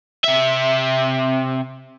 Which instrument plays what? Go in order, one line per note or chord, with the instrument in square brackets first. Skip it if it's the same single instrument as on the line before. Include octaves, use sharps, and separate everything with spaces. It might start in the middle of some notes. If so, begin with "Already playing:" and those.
[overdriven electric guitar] C3 E5